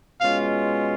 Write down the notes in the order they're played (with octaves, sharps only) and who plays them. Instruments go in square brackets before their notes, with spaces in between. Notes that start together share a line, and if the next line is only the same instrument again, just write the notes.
[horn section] B2 G#3 C#4 F4 F5